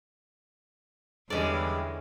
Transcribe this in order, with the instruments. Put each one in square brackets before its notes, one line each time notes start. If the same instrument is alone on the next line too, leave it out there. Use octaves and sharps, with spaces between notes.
[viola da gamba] E2 E3 [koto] D3 C#4 D5 [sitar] G3 G#3 A4